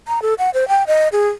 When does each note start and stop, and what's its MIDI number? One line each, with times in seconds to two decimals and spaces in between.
0.08 0.22 82
0.22 0.34 69
0.38 0.50 78
0.54 0.68 72
0.68 0.83 79
0.87 1.08 75
1.12 1.28 68